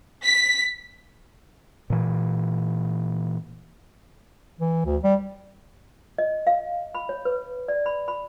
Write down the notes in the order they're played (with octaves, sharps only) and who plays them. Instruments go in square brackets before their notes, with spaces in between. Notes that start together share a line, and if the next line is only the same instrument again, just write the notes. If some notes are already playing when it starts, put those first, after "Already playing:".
[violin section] B6
[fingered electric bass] A#2 E3
[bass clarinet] E3
D2
G3
[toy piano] D#5
F5
B5
C#5
B4
D5
B5
B5